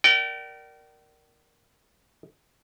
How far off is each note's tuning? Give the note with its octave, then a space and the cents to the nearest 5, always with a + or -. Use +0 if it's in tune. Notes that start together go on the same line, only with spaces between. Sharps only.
A#4 +0 D5 +10 G5 -40